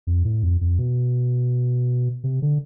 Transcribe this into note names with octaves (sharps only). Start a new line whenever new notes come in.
F2
A2
F2
F2
B2
C3
D3